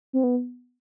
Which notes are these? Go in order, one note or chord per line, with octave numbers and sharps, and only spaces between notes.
C4
B3